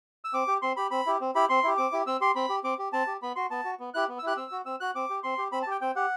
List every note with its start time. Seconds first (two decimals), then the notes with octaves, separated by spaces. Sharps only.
0.25 E6
0.34 C4 D6
0.48 G4
0.62 C4 C6
0.77 G4 B5
0.91 C4 B5
1.06 E4 G4
1.21 C4
1.35 E4 G4 B5
1.49 C4 C6
1.63 E4 G4
1.77 C4 D6
1.92 E4 G4
2.07 C4 E6
2.21 G4 C6
2.35 C4 B5
2.49 G4
2.64 C4 D6
2.79 G4
2.93 C4 A5
3.07 G4
3.22 B3 B5
3.36 F#4 C6
3.51 B3 A5
3.65 F#4
3.80 B3
3.94 E4 G4 F#6
4.08 B3
4.19 E6
4.23 E4 G4 F#6
4.37 C4 E6
4.52 F#4
4.66 C4 E6
4.80 F#4 F#6
4.95 C4 D6
5.10 G4
5.23 C4 C6
5.38 G4
5.52 C4 B5
5.62 A5
5.67 G4 G5
5.81 C4 G5
5.96 G4 F#5